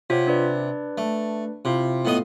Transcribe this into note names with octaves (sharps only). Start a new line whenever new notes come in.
C3 F4 C#5 F#5
D4 B4 D5
A3
C3 E4 F4 F5
A2 B3 D#5